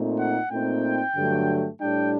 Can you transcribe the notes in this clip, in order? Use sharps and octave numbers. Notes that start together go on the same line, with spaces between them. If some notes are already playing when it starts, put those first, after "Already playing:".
Already playing: A#2 A3 C4 D#4
F#5
A#2 A3 C4 D#4 G5
G2 D3 F#3 A3
A2 G3 D4 G5